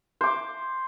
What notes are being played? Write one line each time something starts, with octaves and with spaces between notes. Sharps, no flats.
C5 D6